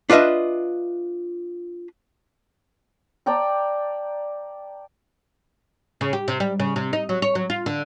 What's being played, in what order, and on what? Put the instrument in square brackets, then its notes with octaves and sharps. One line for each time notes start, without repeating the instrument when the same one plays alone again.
[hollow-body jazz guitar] D4 F4 B4 D#5 E5
[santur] D5 G5 A5 A#5
[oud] C#3
G4
C3
G3
C#3
C3
D#4
F#3
C#5
F#3
F4
D3